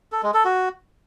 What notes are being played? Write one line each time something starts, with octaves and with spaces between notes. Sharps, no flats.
A4
G#3
A4
F#4